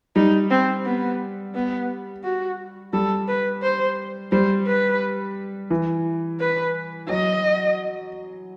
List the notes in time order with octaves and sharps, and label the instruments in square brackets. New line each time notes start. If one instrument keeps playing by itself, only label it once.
[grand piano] G3 [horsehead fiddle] D#4
[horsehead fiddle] C4
B3
B3
F#4
[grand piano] G3 [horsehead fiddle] A4
[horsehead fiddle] B4
C5
[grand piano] G3 [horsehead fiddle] C5
[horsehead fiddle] B4
[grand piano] E3
[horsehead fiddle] B4
[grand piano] F#3 [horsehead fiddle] D#5